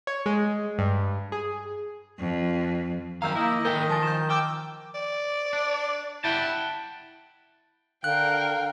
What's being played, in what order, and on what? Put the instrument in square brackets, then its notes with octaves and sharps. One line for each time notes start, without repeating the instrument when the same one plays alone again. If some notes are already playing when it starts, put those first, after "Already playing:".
[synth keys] C#5
G#3
G2
G#4
[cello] F2
[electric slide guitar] F#2 G3 F5 [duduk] D#3 [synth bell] A#5 E6 G6
[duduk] A#3 [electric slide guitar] E4 [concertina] D#5
[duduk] D#3 [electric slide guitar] A#3 A4 G5 [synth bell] A#4 G6 G7
[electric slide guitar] F3 [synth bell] G#5 A5 A6
[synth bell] G6 E7
[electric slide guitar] G5 [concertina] D6 E6 [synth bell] F6 G6
[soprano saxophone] D5
[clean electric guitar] D4
[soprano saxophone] E4 [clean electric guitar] F#5 G5 A5
[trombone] D3 [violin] A#4 G5 [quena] F5 [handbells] F#6